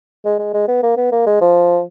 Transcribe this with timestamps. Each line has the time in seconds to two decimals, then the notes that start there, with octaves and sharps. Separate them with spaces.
0.25 G#3
0.39 G#3
0.54 G#3
0.68 B3
0.83 A#3
0.97 B3
1.12 A#3
1.26 G#3
1.41 F3